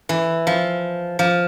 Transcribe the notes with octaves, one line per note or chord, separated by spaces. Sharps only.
E3
F3
F3